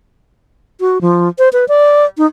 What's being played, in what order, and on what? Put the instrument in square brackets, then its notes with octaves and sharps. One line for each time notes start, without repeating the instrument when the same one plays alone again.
[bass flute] F#4
F3
C5
B4
D5
D#4